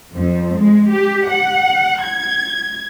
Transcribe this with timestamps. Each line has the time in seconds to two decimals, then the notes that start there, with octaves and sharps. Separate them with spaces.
0.14 F2
0.58 G#3
0.91 G4
1.30 F#5
2.03 G#6